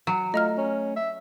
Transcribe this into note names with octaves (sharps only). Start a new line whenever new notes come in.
F#3
A3 F4 D#5 A#5 F6
C#4
E5